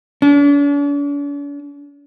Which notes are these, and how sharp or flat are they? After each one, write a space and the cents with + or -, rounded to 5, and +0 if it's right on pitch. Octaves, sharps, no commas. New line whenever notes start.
D4 -45